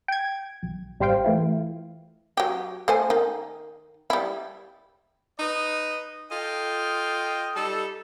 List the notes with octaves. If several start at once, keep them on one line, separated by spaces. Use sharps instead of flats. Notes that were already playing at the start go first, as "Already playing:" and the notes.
G5 G#6
B1
A1 G3 G4 C5 F5 G5
E3 A3 E4 F4
F#3 G4
A3 C5 G#5
D#3
G3 E4
D#4 B4 D#5
F4 A4 D#5 G5
G3 D#4 A4